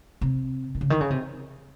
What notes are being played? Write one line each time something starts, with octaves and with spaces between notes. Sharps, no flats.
C3
D#3
C#3
D#3
C#3
C3